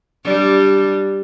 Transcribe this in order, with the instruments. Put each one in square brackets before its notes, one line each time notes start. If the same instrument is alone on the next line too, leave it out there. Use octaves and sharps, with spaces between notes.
[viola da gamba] G3 D4